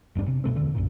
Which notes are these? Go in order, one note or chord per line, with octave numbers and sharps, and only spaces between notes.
G1 E2 G2 D4
C3
D1 B2 A3 C4
E2 D3
B1 F#2 A#2